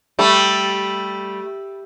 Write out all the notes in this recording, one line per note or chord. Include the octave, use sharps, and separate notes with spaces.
G3 A3